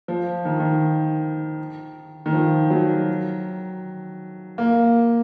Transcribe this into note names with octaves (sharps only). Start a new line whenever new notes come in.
F3
D#3
D#3
D#3
F3
F#3
A#3